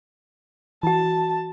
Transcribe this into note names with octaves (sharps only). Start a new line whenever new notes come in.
E3 F#4 A5